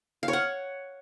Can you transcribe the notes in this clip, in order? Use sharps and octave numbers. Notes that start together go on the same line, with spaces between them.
F5
C#5
F#5